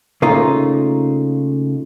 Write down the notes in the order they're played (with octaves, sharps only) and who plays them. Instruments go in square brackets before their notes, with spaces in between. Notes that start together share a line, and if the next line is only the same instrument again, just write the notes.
[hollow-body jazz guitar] C#3 A3 A#3 D#4 F4